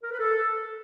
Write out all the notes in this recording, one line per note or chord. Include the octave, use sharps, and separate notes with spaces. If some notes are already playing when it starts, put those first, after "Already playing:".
A#4
B4
A4